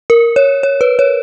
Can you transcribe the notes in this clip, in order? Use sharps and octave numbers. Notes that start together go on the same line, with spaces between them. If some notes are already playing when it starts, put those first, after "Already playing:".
A#4
C#5
C#5
B4
C#5